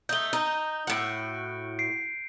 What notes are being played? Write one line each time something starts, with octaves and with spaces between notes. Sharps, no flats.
A3 D#4 G6 G7
D#4
A2 F#4 C#7 D7
C7 D7